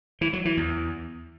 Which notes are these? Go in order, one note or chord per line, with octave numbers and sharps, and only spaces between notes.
E3
F#3
E3
E2